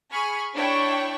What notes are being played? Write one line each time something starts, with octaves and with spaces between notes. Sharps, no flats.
G#4 B5 C#6 F6
D4 E4 C#5 G5 C#6